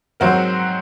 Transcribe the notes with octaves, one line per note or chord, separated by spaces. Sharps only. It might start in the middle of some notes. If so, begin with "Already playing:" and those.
G#2 F#3 C4 F#4 A#4